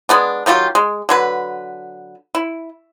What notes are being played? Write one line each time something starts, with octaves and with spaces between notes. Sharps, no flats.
G#3 B3 D4
D#3 F#3 F4 G4
G#3
D3 F#3 B4
E4